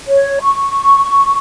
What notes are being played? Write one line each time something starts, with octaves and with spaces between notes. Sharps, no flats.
C#5
C#6